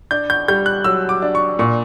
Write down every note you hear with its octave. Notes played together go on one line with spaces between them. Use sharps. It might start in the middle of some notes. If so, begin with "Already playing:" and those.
D4 G6
G6
G3 G6
F#6
F#3 E6
D6
D4
C#6
A#2 C#6